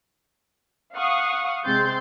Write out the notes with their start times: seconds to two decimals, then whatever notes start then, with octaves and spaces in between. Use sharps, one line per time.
0.94 F5 F#5 C#6 D#6
1.65 C3 G#3 C4 C6 G6 A6